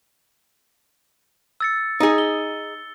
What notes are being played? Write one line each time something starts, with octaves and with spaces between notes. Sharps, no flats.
E6 A6 C#7
D#4 G#4
G7